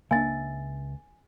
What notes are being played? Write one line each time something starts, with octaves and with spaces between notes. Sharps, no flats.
C#2 A#3 D4 E5 G#5 A6